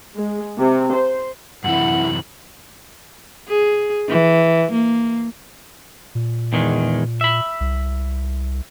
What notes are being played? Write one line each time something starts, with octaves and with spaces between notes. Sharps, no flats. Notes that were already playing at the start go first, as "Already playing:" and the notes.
G#3
C3
C5
F#2 C3 E3 E4 F#5 F#7
G#4
E3
A#3
A#2
E2 D#3 G#3
E5 B5
C2